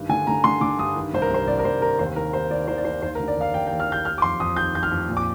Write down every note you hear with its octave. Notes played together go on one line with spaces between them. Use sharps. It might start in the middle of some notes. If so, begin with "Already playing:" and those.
Already playing: G2 D#3
D3 G#5
D3 A#5
D3 C6
D3 D6
G2 D#6
D#3
C2 C5
A#4
C2 C5
C2 D5
A#4
C2 C5
D#3 A#4
D#2 C5
D#3 A#4
D#3 C5
D#3 D5
D#3 C5
D5
D#3 C5
D#2 C5
A#4
D3
D5
D#2 F5
D#2 G5
G5
D#2
F6
D#2 G6
D#3 F6
D6
F2 C6
F2 D#6
D#3 G6
F2 G6
F6
F2
A#2
D6